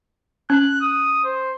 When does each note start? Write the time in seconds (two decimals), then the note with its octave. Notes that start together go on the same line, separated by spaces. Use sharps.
0.50 C#4 F#6
0.81 D#6
1.24 C5